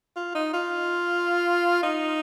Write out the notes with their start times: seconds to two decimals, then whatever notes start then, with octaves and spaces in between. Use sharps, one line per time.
0.16 F4
0.35 D#4
0.54 F4
1.83 D#4